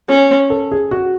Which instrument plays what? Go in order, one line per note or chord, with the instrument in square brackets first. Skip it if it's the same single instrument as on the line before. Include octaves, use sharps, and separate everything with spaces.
[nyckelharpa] C#4
[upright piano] A4
G#4
F#4